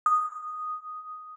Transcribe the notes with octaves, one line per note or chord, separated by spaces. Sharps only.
D#6